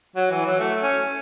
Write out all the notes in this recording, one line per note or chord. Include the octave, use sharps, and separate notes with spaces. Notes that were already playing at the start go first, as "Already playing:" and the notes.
F#3
E3
F#3
A3
C#4